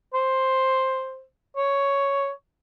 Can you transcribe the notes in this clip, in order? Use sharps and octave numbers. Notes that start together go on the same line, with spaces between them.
C5
C#5